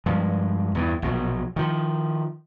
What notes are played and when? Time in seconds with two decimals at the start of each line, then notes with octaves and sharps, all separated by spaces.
0.06 G2 F3 G#3
0.75 E2 G2 E3
1.02 A#1 B2 E3 F#3
1.56 D#3 F3